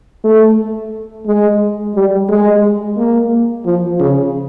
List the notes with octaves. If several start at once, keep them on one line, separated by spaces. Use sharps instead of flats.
A3
G#3
G3
G#3
A#3
F3
C#3